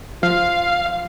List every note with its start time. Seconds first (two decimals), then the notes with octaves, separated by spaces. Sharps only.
0.23 F3 F4 F5